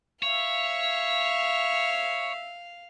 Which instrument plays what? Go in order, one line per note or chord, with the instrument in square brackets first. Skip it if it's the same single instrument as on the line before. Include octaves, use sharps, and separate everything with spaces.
[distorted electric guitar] C#5 [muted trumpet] E5 [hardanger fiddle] F5